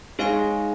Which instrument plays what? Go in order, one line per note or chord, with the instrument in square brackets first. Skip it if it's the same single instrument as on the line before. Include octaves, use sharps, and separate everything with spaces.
[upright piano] G#3 [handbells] D#4 G#4 C#5 F5 G#5